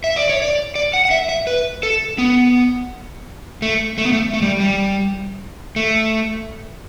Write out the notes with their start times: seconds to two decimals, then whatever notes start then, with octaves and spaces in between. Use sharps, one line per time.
0.04 E5
0.16 D5
0.29 C#5
0.42 D5
0.75 D5
0.94 F#5
1.05 F#5
1.11 E5
1.29 E5
1.47 B4
1.83 A4
2.18 B3
3.62 A3
3.98 A3
4.05 B3
4.13 A3
4.34 A3
4.42 G3
4.60 G3
5.76 A3